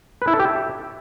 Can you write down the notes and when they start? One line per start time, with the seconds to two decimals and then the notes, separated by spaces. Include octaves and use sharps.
0.22 B4
0.28 E4
0.33 A4
0.39 G4
0.45 E5